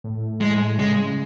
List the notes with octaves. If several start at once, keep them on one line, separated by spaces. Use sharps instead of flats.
A2
G#3
C#3 G#3